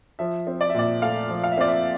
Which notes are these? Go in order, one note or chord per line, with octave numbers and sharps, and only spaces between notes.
F3 E5
C4
D5
E5
A#2 D5
A3 F5
F3
F5
E5
C4 D5
E5